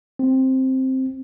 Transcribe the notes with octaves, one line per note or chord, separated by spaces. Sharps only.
C4